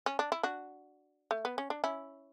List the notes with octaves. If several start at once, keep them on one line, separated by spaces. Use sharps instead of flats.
C#4
D4
E4
D4 F#4
A3
B3
C#4
D4
C#4 E4